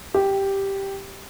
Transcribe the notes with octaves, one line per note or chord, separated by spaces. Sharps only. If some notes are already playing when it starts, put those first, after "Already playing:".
G4